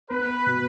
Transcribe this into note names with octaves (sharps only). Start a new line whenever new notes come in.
B3 B4
B2